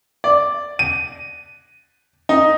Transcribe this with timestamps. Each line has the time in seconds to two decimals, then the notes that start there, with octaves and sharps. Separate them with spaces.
0.24 D5
0.79 D#7
2.29 D#4